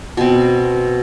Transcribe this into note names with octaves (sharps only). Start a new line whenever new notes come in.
B2 C4